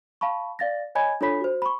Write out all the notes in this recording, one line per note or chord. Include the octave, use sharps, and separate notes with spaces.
F5 A5 B5 C#6
D5 F5 A6 A#6
C#5 D#5 G#5 B5 G#6
D4 F4 A4 C#5 B5 B6
F#4 C5
B5 C#6